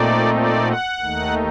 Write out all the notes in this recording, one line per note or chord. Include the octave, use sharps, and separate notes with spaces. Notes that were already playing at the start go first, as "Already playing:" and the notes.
Already playing: A#2 A3 C4 D#4 D5
D5
F#5
D#2 D#3 A3 D#4